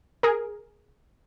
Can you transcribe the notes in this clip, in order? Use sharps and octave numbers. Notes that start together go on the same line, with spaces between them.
G#4 A#4